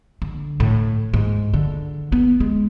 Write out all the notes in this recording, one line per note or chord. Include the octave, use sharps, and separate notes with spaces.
D3
A2
G#2
D3
B3
G#3